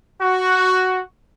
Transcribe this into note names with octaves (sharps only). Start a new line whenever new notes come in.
F#4